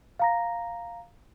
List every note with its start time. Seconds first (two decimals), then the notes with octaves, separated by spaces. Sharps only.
0.19 F5 A#5 A#6